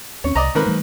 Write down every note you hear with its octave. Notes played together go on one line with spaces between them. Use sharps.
D#2 C4 C#4 C#5
C2 D5 D#5 A#5
G#2 D#3 C4 A#4 B4
E3 G3 A3